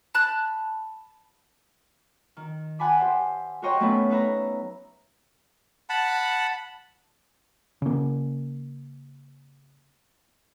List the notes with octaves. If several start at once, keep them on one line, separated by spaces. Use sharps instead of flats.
A5 B5 F#6
D#3
F#5 G#5 A5 B5 D6
G4 C5 E5
F#4 A#4 C5 C#5 D#5 G5
F#3 A3 B3 C#4 B4 E5
D#4 B4 E5 A#5
F#5 A5 B5
C#3 A#3